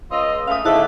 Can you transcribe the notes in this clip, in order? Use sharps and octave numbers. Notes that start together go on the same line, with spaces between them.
C#2 F4 D#5 C6 E6
C#3 A3 F5 D#6
D#2 G#2 D3 A3 E4 E5 A5 F#6